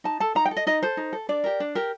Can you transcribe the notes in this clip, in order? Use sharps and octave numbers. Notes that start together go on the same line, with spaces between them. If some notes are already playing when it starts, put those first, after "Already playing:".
D#4 A5
A4 A5
D#4 A#5
G5
A4
D#5
D#4 D#5
A4 C5
D#4
A4
D4 D5
G4 A#4
D4
G4 A#4